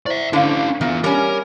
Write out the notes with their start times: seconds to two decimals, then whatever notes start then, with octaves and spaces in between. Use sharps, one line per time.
0.06 E4 C5 D5 E5 C#6
0.33 D3 C#4 D#4 E4 F5
0.81 A#2 E3 B3 E5
1.04 G3 C#4 A#4